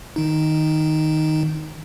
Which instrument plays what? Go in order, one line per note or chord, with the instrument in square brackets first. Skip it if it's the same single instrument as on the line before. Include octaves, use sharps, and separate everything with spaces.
[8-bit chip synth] D#3 D#4